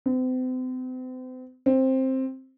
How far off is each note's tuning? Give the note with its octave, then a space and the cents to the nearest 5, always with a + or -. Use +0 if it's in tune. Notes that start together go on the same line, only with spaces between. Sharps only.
C4 -40
C4 +10